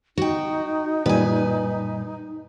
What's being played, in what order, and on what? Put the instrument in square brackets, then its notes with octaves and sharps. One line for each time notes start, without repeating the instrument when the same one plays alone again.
[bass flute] D#4 [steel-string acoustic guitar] F#4 G5
[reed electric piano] F#2 A#2 G3 [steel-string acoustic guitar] B4 G#5